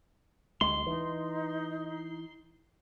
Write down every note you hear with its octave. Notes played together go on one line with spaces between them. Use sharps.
D2 G#3 C6
E3 D#4